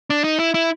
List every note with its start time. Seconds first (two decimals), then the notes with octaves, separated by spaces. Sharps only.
0.10 D4
0.24 D#4
0.39 E4
0.54 E4